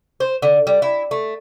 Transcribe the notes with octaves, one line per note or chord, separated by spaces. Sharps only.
C5
D3
G3
E4
A3